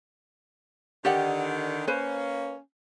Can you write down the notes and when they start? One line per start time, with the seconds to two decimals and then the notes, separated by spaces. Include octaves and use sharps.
1.05 D3 D#3 G4 D5 F#5
1.88 A#3 C#4 B4 C5